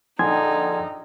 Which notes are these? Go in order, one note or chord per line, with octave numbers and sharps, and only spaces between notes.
A#1 D3 D#4 G#5 C6 G#6